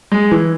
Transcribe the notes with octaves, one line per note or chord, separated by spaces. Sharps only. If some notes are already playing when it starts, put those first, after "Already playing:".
G#3
E3